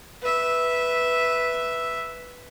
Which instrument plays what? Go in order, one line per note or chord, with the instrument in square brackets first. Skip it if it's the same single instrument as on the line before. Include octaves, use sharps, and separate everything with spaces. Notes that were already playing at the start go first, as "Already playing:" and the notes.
[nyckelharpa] B4 E5